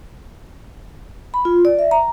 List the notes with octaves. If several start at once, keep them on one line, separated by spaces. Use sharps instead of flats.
B5
F4
D5
E5
A#5